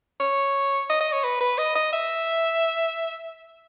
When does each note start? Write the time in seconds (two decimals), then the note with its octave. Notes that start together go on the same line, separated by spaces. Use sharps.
0.20 C#5
0.90 D#5
1.00 D#5
1.12 C#5
1.24 B4
1.41 B4
1.58 D#5
1.75 D#5
1.93 E5